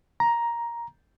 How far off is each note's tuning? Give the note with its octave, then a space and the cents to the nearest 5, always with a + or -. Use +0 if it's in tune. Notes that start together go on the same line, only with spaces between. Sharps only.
A#5 +10